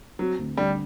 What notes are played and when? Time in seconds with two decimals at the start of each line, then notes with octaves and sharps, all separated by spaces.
0.19 F#3 C4
0.39 D2
0.57 D3 G3